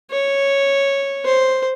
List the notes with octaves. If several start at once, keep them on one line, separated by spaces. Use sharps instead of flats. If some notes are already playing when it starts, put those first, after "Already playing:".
C#5
C5